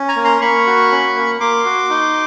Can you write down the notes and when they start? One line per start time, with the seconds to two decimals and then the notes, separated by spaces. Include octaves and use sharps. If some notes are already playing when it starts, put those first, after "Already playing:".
Already playing: C#4
0.08 G#5 A#5
0.16 A#3
0.25 A#5 C6
0.41 A#3 B5 C#6
0.67 F#4
0.92 C#4
1.16 A#3
1.40 A#3 C6 D6
1.65 F#4
1.90 D#4